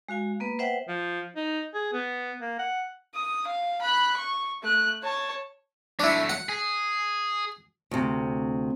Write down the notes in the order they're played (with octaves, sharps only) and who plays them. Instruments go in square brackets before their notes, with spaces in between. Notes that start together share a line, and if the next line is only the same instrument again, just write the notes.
[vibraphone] G#3 F#4 F5 G#5
A#3 B3 B4
B4 C5 E5 F#5 G5
[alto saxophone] F3
D#4
G#4
B3
A#3
F#5
[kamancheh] D#6
F5
B5 F#6
C#6
A3 F#6
C#5 A5
[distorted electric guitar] F#3 A3 [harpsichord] D4 E4
[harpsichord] F#5
[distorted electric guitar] G#4
[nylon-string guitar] D2 C3